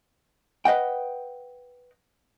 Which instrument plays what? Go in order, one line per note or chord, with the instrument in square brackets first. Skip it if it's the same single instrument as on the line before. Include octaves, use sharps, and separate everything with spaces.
[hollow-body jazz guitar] B4 D#5 F#5 G5